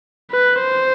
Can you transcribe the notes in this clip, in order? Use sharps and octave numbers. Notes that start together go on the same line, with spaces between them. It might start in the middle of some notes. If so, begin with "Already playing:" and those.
B4
C5